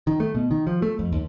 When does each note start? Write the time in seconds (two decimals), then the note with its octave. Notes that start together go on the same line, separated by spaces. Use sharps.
0.07 D#3
0.20 A3
0.35 B2
0.51 D#3
0.67 F3
0.82 A3
0.99 F2
1.12 D#2